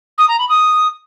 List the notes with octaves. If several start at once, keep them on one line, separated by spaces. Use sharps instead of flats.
D#6
A#5
B5
D#6